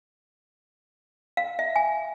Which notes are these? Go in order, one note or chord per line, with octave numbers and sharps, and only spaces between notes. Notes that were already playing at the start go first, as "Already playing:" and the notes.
F5
E5
G#5